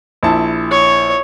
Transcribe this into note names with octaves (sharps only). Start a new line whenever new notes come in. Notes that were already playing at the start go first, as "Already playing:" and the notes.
A#1 E4 A5
C#5